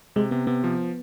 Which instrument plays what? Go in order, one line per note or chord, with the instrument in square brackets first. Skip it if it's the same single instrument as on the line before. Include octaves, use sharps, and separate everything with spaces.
[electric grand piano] C3 [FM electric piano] G#3
[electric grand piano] C3 [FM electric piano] B3
[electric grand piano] C3 [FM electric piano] B3
[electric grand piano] F3